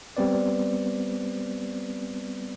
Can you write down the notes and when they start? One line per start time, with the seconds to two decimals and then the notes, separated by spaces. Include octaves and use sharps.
0.17 G3 B3 C4 B4 D5